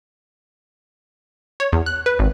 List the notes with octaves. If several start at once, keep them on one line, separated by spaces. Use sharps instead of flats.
C#5
E2
F#6
B4
G#1